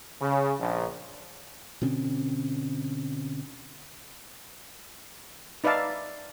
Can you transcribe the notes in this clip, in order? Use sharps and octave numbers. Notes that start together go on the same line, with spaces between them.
C#3
A#1
B2 D3 C4 C#4
D#4 B4 D5 E5 F5 A5